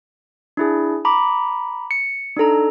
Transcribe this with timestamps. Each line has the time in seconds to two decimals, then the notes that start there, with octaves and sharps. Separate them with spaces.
0.57 D4 E4 G#4
1.05 A#5 B5 D6
1.91 C#7
2.36 D4 D#4 A4 A#5